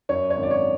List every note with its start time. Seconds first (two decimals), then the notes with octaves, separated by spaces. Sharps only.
0.09 F#2 C#5
0.30 C#5
0.37 G#1
0.43 D5
0.51 C#5